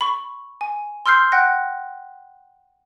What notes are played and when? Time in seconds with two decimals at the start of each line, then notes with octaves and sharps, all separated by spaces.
0.01 B5 C#6
0.61 G#5
1.06 C6 E6 F6 G6 C7
1.32 F#5 G5 F#6 A#6